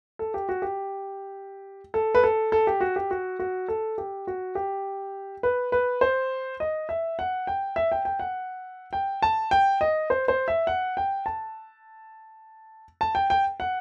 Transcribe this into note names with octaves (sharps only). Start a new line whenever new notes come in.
A4
G4
F#4
G4
A4
B4
A4
A4
G4
F#4
G4
F#4
F#4
A4
G4
F#4
G4
B4
B4
C5
D#5
E5
F#5
G5
E5
G5
G5
F#5
G5
A5
G5
D#5
C5
C5
E5
F#5
G5
A5
A5
G5
G5
F#5